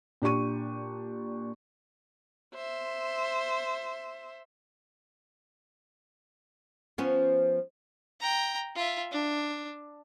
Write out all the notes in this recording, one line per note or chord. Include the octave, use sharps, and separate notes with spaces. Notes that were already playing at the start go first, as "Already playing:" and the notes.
A#2 D4 G4 C#6 D#7
C5 E5
F3 B3 C#4
G5 A#5
F4 E5
D4